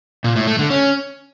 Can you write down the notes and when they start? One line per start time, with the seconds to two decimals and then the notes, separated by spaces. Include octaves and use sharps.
0.24 A#2
0.36 A2
0.47 A3
0.59 D3
0.70 C#4